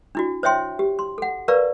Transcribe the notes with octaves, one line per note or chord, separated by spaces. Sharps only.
D4 E4 F#4
C5 C#5 E5 G5 C6
G4
C6
A4 F#5
A#4 B4 D5 F5 A#5 C#6